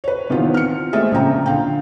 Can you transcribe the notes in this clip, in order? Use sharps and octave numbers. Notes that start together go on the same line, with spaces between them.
B4 C#5
C3 D#3 E3 B3 F4
F6 C#7
G#3 A3 C4 G#4 A4 E5
A#1 C#3 F3 G5 A#5
D3 F5 G5